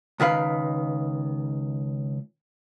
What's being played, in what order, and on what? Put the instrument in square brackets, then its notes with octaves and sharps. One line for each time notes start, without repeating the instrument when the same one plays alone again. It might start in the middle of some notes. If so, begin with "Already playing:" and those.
[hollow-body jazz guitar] C#2 D#3 B4 F5